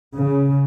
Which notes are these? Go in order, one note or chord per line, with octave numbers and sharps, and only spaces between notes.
C#3